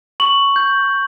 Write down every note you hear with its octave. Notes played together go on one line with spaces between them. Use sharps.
C#6 F#7
G6